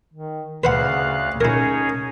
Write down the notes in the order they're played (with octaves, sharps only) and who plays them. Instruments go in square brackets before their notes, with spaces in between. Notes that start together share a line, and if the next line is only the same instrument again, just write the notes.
[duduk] D#3
[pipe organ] D2 F5 F#6 [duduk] C#3 [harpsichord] B4 C5 F#5
[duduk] C#4 [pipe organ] D#4 G#4 C#5 [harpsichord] E4 A#4